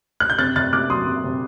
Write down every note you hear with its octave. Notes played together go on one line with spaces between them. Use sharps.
F#6
G6
C3 F#6 A6
C3 F#6 A6
A#3 D6 F#6
F#3 C6 D#6
C3
C3